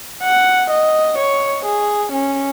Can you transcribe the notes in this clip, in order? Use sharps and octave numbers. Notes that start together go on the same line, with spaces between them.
F#5
D#5
C#5
G#4
C#4